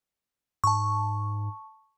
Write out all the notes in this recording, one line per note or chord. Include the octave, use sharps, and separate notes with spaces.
G#2 A5 C#6